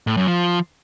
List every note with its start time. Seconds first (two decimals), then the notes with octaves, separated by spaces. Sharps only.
0.07 A2
0.17 F#2
0.27 F3